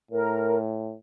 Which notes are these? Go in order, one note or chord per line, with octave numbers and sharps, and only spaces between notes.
A2 A#4